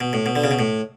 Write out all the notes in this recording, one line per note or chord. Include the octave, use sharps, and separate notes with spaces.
B2
A2
B2
D3
C#3
B2
A2